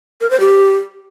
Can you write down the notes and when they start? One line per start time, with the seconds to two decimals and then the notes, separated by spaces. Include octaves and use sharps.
0.21 A#4
0.31 C5
0.40 G4